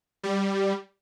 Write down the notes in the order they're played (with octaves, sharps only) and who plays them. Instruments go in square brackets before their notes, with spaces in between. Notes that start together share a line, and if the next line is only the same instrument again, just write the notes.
[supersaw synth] G3